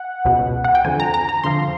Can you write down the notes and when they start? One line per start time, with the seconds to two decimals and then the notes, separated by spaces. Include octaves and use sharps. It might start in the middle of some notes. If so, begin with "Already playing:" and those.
Already playing: F#5
0.25 C#2 B2
0.64 F#5
0.75 G5
0.85 F2 D3 F3 G#5
1.00 A#5
1.14 A#5
1.29 A#5
1.44 F2 D3 F3 C6